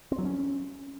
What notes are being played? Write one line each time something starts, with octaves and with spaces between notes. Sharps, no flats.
C4
F#3
C#4